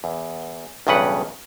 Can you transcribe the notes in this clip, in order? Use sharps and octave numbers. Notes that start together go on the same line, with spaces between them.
E2
B1 E2 G2 C#3 B4 F#5